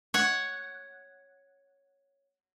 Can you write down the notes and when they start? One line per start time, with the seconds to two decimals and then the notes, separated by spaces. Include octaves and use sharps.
0.14 C#5 F#5